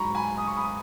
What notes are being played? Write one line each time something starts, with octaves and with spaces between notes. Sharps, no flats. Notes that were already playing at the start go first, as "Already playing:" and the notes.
Already playing: G#2 F#3 A#5 B5 C#6
G#5 B5
D#6
C#6
B5 D#6